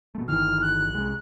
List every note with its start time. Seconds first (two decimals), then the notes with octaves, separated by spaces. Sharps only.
0.15 B2 A3
0.27 G1 D#3 E3 F6
0.61 F#6
0.90 C2 G#3